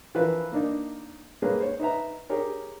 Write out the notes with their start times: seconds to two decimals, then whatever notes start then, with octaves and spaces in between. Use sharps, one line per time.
0.15 E3 F3 E4 F4 A#4 B4
0.52 A#3 D4 D#4
1.42 G3 G#3 A#3 C#4 G#4 B4
1.60 C5 C#5
1.80 D#4 B4 E5 A#5
2.30 G4 G#4 A#4 C#5